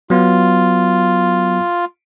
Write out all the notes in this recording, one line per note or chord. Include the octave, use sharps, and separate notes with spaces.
F#3 B3 F4